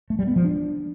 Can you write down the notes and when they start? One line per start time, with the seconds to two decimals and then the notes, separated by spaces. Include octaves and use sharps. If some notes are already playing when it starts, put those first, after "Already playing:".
0.10 A3
0.19 G3
0.27 B3
0.36 F3
0.44 D4